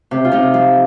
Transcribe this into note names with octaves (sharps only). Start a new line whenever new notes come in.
C3
F4
C3 D#4
F3